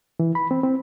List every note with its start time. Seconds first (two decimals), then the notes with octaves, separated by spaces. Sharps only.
0.20 E3
0.35 B5
0.51 C4
0.63 C4